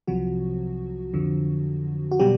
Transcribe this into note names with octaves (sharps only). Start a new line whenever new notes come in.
C2 C3 F3 F#3 F#4
F2 D3 F3
F#4
B2 F#3 G3 G4